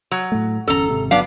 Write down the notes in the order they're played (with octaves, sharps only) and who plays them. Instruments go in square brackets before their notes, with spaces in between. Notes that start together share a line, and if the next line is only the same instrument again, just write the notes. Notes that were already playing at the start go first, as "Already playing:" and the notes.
[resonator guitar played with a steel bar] F#3
[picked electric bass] A2 A3
[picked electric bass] G1 E2 C#4 [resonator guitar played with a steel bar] A4 A#5
[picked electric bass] G#1 C3
[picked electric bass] G1 D#2 F#3 [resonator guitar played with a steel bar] B3 D4 F5